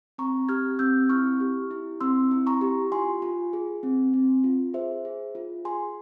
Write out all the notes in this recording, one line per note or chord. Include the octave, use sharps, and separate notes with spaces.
C4 A#5 C#6
G4 F6 G#6
C4 E6 G6
E4 C#6 F6
G4
E4
C4 C6 E6
E4
A#5 C#6
G4
F4 G#5 C6
F4
G#4
C4
C4
F4
G#4 C5 E5
G#4
F4
G#4 G#5 C6